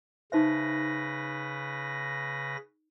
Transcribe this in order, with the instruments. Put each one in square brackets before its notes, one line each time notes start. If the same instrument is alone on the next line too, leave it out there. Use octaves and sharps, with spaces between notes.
[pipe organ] C#3 B4 A#6 [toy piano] D#4 C5 E5